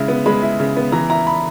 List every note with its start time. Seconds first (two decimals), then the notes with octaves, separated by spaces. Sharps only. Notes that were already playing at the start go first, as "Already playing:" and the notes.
Already playing: C#3 G#3 E4
0.08 B3
0.26 G#3 B5
0.42 E4
0.60 C#3
0.77 B3
0.92 E3 A#5
1.10 E4 A#5
1.27 B5